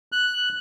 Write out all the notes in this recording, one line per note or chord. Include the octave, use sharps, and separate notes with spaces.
F#6